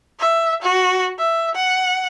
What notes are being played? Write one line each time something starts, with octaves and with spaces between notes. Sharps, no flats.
E5
F#4
E5
F#5